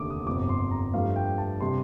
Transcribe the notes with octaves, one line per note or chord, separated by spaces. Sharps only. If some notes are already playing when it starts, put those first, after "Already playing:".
Already playing: F1 D#2 D3 A3 D6 D#6
D#6
G1 F2 C3 F3 D6
C6
A#5
G2 F3 A3 F5
G5
A5
C3 G3 C6